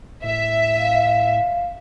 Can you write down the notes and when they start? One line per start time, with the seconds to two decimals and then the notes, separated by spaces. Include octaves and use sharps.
0.24 A2 E5
0.78 F5